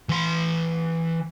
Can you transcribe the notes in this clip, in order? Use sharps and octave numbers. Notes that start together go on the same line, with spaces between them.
E3 C6